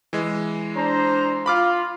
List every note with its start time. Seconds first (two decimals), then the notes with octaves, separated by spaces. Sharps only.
0.13 E3 G#3
0.75 D4 C5 A#5
1.46 F4 B5 D6 F6